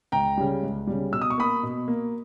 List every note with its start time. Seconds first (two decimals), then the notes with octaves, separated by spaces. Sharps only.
0.12 C#2 G5 A#5
0.38 C#3 G3
0.63 C#2
0.87 C#3 G3
1.12 B2 E6
1.22 D#6
1.30 C#6
1.38 A#3 B5 D#6
1.63 B2
1.88 A#3